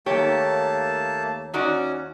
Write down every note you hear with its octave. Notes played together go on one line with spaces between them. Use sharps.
D#2 A3 A#3 G4 C#5 A5
C#4 D#4 F#4 D5